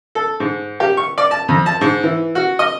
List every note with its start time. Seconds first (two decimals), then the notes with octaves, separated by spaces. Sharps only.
0.15 A4
0.40 G#2
0.80 G4
0.97 C#6
1.18 D5
1.31 A5
1.48 F2
1.66 A5
1.81 G#2
2.03 E3
2.35 F#4
2.59 D#5